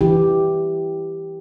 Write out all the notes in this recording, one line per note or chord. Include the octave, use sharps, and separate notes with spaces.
E3 E4 G4